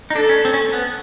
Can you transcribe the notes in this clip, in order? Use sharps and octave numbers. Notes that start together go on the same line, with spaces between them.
D#4
D4 A4
C#4
C4
C#4
B3